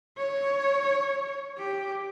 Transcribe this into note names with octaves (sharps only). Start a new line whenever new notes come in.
C#5
G4